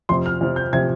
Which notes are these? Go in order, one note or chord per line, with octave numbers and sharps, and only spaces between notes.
F2 C3 F3 C6
F6
F2 C3 F3
G6
C3 F3 G#6